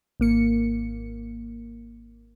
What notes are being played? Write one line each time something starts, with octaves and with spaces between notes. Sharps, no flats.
G#1 A#3 C#7